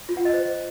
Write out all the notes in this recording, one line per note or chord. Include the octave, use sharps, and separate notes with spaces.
F4
F#5
D#5
C5